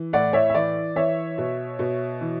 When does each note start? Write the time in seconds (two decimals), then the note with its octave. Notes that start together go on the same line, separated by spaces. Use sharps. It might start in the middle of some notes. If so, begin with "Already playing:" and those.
Already playing: E3
0.13 A2 D5 F#5
0.33 C#5 E5
0.50 E5
0.55 E3 D5
0.96 E3 C#5 E5
1.38 B2
1.79 B2
2.21 E3